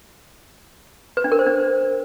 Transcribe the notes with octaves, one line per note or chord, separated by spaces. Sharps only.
B4
D4
A#4
C5
D4